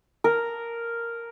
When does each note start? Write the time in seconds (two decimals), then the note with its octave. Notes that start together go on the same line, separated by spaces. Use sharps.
0.24 A#4